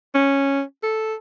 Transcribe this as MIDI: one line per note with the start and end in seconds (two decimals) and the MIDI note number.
0.15 0.62 61
0.83 1.14 69